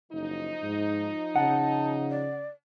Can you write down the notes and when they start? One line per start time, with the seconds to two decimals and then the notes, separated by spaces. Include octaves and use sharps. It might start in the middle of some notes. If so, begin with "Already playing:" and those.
0.12 F#1 F3 D#4
0.63 G#2
1.36 C#3 F#5 A5
2.10 D5